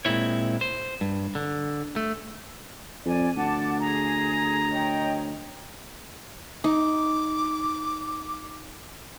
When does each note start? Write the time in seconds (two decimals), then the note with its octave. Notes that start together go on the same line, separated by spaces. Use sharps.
0.05 A#2 G#3 C4 E4 C#5
0.61 C5
1.01 G2
1.35 D3
1.96 A3
3.05 F2 D5 G#5
3.36 D2 F#5 A5 D6
3.80 G#4 A#5
4.71 C#5 D#5 G5
6.64 D#4 D6